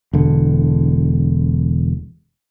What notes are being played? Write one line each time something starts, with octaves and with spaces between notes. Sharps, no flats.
E1 D3